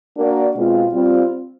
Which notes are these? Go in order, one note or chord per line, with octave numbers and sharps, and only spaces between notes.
A#3 D4 F#4 A#4 D5
B2 G#3 C4 F4
G3 C4 F4